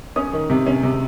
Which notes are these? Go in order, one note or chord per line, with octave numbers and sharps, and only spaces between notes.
C#4 D#6
D#3
C3
C#4
C3